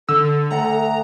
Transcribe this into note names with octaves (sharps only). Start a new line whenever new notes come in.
D3 A4 E6
D2 F#5 A#5